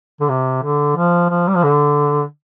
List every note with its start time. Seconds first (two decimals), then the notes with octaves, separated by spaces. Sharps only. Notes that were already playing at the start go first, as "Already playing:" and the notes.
0.21 D3
0.29 C3
0.63 D3
0.96 F3
1.30 F3
1.48 G3
1.56 F3
1.64 D3